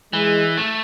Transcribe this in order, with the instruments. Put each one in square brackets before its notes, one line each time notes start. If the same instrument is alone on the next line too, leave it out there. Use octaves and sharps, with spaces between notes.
[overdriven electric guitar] E3 [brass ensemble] G#3
[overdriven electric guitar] A3